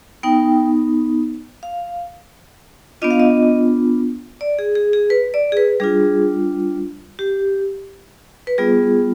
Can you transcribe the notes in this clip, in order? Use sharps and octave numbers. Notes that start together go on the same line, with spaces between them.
B3 D#4 G5
F5
B3 D4 F4 D#5
F5
D#5
D5
G#4
G#4
G#4
B4
D5
G#4
B4
G3 D4 F4 G#4
G4
B4
G3 B3 F4 G#4